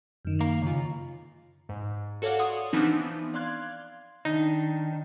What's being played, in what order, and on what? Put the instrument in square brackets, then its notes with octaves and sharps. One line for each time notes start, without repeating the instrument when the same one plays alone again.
[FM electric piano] F#2 D#3
[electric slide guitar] A#3 F5 A#5
C#3 F4
[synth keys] G#2
F#4 A4 C#5 D5 F5 F#5
C#5 F#5 C6 D#6
E3 F3 B3 C4 D4 D#4
D5 F5 C6 F#6 G#6
[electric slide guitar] D#3 D4 [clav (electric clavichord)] D#4